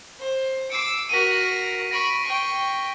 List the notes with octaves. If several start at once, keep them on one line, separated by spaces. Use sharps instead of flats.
C5
D6 E6 C7 C#7
F#4 A#4 B6 D#7
B5 C#6 A#6 D7
G5 C#6